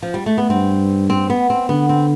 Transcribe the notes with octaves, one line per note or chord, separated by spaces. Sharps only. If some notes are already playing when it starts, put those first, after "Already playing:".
F3
G3
A3
B3
G2 C4
C4
B3
C4
D3 B3
C4